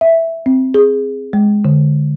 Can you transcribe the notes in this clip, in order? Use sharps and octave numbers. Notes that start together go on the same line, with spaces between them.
E5
C4
G#4
G#3
D3